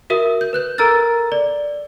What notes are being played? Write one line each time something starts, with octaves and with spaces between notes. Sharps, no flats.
F#4 A#4 E5 D#6
G6
B4 F#6 G6
A4 A#4 A#5 E6 F6 A6
D5